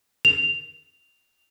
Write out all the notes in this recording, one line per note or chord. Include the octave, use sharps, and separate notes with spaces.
F7